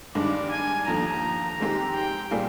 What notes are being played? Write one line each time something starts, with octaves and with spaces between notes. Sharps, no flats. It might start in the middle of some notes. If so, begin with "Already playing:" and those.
G2 D#3 G#3 D4 D5
G#5
D#2 D3 F3 A#5
G#2 D#3 G#3 C4 G4
G5
A#2 G3 C4 F4 G#4